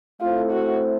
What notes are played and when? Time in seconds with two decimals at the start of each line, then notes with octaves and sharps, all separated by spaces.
0.21 A3 C4 E4 F4 A4 C5
0.51 F#4